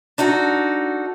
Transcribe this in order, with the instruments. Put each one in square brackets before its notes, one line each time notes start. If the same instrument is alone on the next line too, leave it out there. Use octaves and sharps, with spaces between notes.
[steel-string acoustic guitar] D4 D#4 F#4 A4